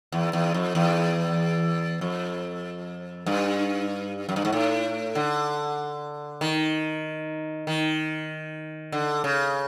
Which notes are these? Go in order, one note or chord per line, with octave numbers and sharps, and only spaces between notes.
E2
E2
F2
E2
F2
G2
F#2
G2
G#2
A2
D3
D#3
D#3
D3
C#3